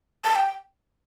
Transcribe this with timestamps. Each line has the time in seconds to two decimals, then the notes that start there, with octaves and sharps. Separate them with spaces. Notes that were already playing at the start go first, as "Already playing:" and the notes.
0.24 A5
0.35 G5